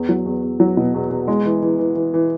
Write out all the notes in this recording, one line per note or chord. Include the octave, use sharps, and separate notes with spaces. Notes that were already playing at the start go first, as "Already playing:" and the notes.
Already playing: E2
F#3
E2
E2
F#3
B2
E2
E2
G#3
E3
E3
E3
E3
E3